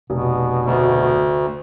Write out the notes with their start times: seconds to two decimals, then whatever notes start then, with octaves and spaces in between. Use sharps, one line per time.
0.10 F1 B2
0.66 D2